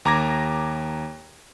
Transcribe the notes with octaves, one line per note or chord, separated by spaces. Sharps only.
D#2 A#5 D6 G#6 A#6